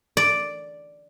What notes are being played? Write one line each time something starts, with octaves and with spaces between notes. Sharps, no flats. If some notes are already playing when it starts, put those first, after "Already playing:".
D5